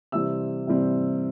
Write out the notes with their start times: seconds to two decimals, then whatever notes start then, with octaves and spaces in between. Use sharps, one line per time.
0.12 C3 E3 G3 C4 E6
0.67 C3 E3 G3 C4